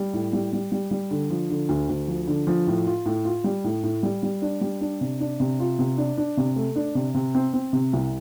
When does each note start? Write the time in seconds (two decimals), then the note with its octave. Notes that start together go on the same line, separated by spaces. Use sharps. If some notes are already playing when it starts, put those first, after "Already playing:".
Already playing: G3
0.13 A2
0.33 G3
0.53 G3
0.72 G3
0.91 G3
1.11 D3
1.30 F3
1.50 D3
1.69 D2
1.89 D2
2.08 F3
2.28 D3
2.47 F3
2.67 A2
2.87 F4
3.06 A2
3.25 F4
3.44 G3
3.64 A2
3.84 A2
4.03 G3
4.23 G3
4.42 D4
4.61 G3
4.81 D4
5.01 C3
5.20 D4
5.40 C3
5.59 F4
5.79 C3
5.98 D4
6.17 D4
6.37 C3
6.56 A3
6.76 D4
6.95 C3
7.14 C3
7.35 C4
7.54 C4
7.73 C3
7.93 C2